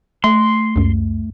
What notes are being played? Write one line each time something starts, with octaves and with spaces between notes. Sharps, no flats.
A3 C6
C#2 F#2